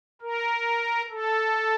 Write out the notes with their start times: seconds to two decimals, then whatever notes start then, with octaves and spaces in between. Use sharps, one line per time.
0.22 A#4
1.11 A4